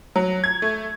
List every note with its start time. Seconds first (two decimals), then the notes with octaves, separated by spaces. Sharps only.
0.16 F#3
0.44 G#6
0.62 A3